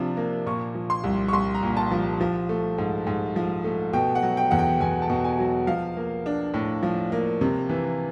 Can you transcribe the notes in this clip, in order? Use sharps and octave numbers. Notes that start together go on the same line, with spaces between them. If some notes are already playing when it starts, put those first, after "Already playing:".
Already playing: C3 F3 D4
A#3
A#2 C#6
F3
C6
C2
C#6
C2 C6
A#5
A#2
A5
F3
F3
A3
G#2
G#2
F3
A3
B2 G5
F#5
F#3
G5
E2 F#5
G5
E2 G#5
A5
B2
G#5
F#3
F3 F5
A#3
D4
A2
F3
A#3
C3
E3